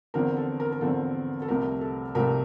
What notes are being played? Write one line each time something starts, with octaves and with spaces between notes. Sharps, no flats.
E2 D3 F3 C4 A#4
A4
A#4
A#4
E2 D3 F3 C4 A4
A4
C2 C3 F3 A3 A#4
A4
C2 C3 F3 A3 A#4